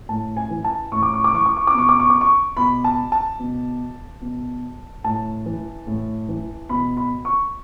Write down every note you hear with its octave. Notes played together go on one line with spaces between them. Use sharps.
A2 A5
G#5
E3
A5
A2 C#6
D6
C#6
D6
E3 C#6
D6
C#6
D6
B2 C#6
D6
C#6
D6
C#6
B2 B5
A5
A5
B2
B2
A2 A5
E3
A2
E3
B2 B5
B5
C#6